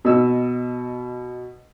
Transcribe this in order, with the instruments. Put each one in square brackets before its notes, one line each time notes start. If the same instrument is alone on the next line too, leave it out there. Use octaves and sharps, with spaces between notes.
[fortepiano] B2 D#5 E6